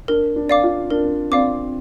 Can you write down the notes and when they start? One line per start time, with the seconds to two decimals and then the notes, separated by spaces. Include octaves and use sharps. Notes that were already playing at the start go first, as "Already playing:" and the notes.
0.08 D4 A#4
0.36 D4
0.49 D5 F5 D6
0.63 F4
0.90 D4 A#4
1.32 C4 D5 F5 D6